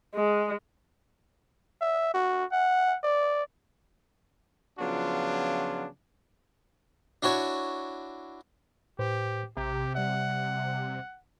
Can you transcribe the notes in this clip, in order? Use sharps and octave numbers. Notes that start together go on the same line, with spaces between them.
G#3
E5
F#4
F#5
D5
C#3 F3 F#3 B3 D4 F4
D4 E4 F#4 C#5
A2 G4 B4 C5
A#1 C3 G4 A#5
G3 D5 E5 F#5